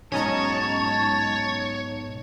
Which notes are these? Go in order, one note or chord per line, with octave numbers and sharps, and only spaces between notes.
B1 G#2 C#4 C#5 D#5 A5 A#5